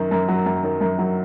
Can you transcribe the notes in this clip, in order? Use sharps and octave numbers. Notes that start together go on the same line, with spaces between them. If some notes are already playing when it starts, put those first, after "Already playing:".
Already playing: F#2 D#3
F#2
F#3
F#2
D#3
F#2
F#3